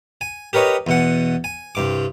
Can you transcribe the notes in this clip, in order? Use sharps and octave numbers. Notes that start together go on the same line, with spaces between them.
G#5
G4 A#4 B4 C#5 D#5
E2 B2 F#5
G#5
C2 G2 D6